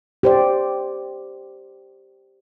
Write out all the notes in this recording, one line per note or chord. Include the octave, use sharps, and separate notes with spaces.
G4 C5 D5